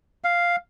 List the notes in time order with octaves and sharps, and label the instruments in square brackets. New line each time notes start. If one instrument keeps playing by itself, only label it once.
[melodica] F5